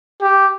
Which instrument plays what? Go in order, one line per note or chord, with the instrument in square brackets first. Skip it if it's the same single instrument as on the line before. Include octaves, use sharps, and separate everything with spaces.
[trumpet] G4